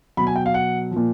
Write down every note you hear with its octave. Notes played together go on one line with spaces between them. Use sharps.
B2 F#3 B5
G#5
G5
F5
F#5
F3
A#2